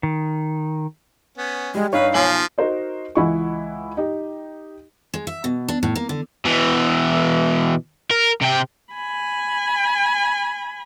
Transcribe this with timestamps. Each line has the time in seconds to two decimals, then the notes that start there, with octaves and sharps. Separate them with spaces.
0.03 D#3
1.38 B3 C#4
1.75 G3 G#3
1.93 G2 D#4 B4 C#5 F5
2.14 B1 F3 G#5 F#7
2.58 D#4 F#4 A#4 C5 D#5
3.15 C#2 E3 E4 D#5 F#5 C#6
3.97 D#4 G4
5.14 G#3
5.27 E5
5.44 B2
5.68 D4
5.83 A2
5.95 A#3
6.09 D3
6.45 B2 E3
8.11 A#4
8.41 C3 G5
8.94 G#5 B5